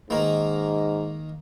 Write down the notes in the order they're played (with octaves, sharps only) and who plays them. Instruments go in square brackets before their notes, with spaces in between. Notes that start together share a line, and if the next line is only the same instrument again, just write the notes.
[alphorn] G#2 [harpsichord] D#3 A#3